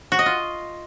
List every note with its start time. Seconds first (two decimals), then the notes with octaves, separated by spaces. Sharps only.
0.12 F#4
0.19 D#5
0.26 F4